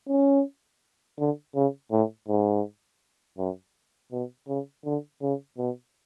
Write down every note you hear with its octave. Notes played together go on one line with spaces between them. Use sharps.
C#4
D3
C#3
A2
G#2
F#2
B2
C#3
D3
C#3
B2